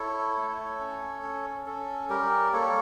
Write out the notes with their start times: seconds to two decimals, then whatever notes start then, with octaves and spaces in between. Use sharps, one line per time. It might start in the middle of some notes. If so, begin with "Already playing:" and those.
Already playing: E4 A4 C#5
0.37 A3
0.80 C#4
1.23 C#4
1.66 C#4 A4
2.09 G3 G4 A#4
2.52 A#3 A4 C#5